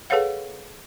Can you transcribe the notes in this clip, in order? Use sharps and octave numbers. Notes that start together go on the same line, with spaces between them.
G#4 A4 B4 C#5 F5 F#5